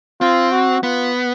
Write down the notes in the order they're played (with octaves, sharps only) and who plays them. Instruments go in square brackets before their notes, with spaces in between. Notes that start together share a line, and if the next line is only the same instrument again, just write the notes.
[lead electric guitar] C4 [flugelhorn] F4
[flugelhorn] F#4
[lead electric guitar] B3 [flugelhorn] F4